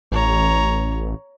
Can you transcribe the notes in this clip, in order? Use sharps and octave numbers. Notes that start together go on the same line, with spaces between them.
A1 C#5 A#5